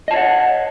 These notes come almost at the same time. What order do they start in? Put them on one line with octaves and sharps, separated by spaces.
D#5 A5 C#5 F#5